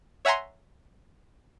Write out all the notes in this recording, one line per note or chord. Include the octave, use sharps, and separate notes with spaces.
C#5 E5 F#5 G#5 A#5 C6